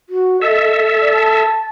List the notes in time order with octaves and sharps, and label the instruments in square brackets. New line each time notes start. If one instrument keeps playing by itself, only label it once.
[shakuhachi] F#4
[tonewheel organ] A4 E5 [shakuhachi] D#5
[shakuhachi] D5
A5